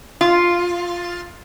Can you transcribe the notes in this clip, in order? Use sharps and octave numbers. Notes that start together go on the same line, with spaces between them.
F4